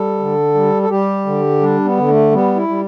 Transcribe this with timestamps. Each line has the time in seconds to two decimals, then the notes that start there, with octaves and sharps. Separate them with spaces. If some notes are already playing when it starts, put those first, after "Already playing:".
Already playing: G3 A4
0.19 D3
0.55 G3
0.82 A4
0.90 G3 G4
1.26 D3
1.61 G3 D4
1.85 B3
1.97 D3
2.09 A3
2.32 G3 B3
2.56 E4
2.68 G3